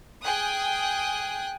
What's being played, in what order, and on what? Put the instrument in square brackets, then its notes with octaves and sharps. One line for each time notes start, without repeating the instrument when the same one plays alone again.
[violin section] G#4 G5 G#5 D#6 F#6